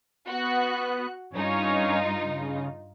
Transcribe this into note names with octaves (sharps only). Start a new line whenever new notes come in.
B3 F#4 F#6
G2 C#4 D#4 F4 C#5
C#3